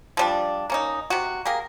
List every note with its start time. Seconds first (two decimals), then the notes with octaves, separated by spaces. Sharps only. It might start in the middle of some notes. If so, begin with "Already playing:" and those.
0.17 F3 G3 D4
0.70 A#3 C#4 D#4
1.10 C3 F#4
1.45 A#3 G4 G#4 A#4